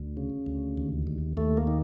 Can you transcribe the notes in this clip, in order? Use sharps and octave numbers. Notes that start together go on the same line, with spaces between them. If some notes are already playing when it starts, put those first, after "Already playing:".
Already playing: D2
C#3
D2
D#2
D#2
D#2 A3
A#3
D#3